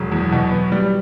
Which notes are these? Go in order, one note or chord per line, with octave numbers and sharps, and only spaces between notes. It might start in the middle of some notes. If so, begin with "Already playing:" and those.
Already playing: E1 F#3
E2
B2
B3
G3